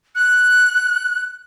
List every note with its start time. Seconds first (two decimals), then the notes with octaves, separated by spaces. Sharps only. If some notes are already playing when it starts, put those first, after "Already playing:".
0.15 F#6